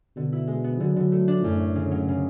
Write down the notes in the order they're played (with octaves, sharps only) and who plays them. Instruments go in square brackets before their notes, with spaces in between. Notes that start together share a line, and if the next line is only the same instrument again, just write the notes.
[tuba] B2 [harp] D3
[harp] E4
G#3
B3
[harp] D3 [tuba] F#3
[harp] D3
A3
D4
[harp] F#2 [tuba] A2
[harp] C#4
C#3
F#3
C#3